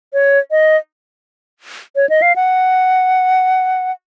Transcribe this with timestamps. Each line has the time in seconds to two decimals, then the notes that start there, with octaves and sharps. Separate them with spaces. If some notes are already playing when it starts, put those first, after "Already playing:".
0.13 C#5
0.51 D#5
1.96 C#5
2.09 D#5
2.22 F5
2.36 F#5